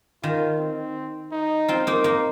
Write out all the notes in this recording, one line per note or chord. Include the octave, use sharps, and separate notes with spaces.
D#3 F4
C4
D#4
C4 F4
A#3 D#4
A#3 D#4